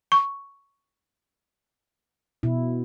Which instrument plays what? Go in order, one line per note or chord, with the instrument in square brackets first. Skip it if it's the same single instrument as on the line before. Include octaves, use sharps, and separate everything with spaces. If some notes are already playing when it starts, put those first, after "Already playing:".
[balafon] C#6
[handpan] B2 E4